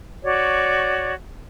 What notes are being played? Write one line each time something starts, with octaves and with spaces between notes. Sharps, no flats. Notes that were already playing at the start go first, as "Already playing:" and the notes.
F#4 C#5 D5